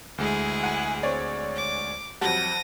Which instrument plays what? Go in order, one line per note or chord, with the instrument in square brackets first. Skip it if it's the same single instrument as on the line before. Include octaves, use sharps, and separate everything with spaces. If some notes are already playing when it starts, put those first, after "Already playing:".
[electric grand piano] D2 G#3 [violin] E4 G#4
[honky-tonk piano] F#5 G#5
C4 C#5 D5
[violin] D6
[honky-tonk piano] F2 F#3 G3 [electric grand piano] F#5 A5 [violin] A#6 D#7